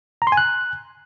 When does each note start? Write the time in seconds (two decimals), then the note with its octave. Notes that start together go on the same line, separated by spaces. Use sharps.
0.22 A#5
0.27 C6
0.32 G#5
0.37 F#6